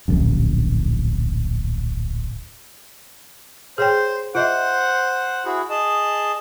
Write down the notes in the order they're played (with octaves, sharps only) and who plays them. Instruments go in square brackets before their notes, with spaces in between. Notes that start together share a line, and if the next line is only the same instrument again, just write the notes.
[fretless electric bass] D1 A#1 F#2
[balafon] G#4 C#5 G5 [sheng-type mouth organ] C5
[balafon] F4 D#5 E5 [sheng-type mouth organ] C5 F#5
[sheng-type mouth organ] E4 F#4 G#4
G#4 D#5 A5